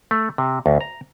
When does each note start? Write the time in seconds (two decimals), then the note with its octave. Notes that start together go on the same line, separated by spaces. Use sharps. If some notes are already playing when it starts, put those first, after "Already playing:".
0.11 A3
0.38 C3
0.66 D2
0.81 A#5